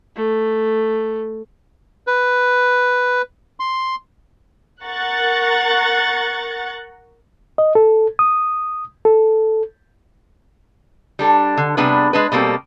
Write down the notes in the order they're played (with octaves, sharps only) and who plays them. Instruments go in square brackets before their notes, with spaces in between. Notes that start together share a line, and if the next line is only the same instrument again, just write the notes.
[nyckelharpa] A3
[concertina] B4
C6
[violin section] A#4 F#5 A#5 C#6 F#6 A6
[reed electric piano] D#5
A4
D#6
A4
[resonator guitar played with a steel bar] G3 D4 A4
D3
C3 G3 B3 D4 G#4 B4
G#3 D4 B4
B2 G3 A#3 C4 A4